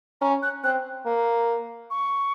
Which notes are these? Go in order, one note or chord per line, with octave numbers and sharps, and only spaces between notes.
C#4 A#5
F#6
C4 F#6
A#3
C#6